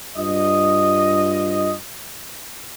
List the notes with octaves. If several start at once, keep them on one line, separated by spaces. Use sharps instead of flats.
G2 F4 D#5